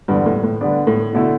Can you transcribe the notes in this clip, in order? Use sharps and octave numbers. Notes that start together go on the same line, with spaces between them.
E2 G2 D3 G3
A2
A2
D3 G3 B3 D4
A2
B2 D3 A3 E4